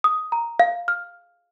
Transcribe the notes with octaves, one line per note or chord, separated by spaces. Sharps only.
D#6
A#5
F5
F6